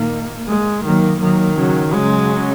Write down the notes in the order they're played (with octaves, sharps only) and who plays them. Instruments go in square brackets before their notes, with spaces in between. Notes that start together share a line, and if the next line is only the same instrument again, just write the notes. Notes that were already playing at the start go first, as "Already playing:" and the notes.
Already playing: [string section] A#2 D#3 [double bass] A#3
[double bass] G#3
[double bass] D#3 [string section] F#3 A#3
[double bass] D#3 [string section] F#3 A#3
[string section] C#3 F#3
[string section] C#3 F#3 [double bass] G#3